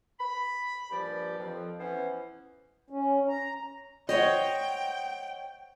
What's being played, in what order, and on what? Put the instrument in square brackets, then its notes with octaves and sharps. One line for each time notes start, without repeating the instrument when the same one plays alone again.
[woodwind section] B5
G2 A#2 F3 G4 D5
F2 F3
E3 B3 C#4 C5
[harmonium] C#4
A#5
[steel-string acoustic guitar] C5 C#5 F#5 [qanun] D#5 [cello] G5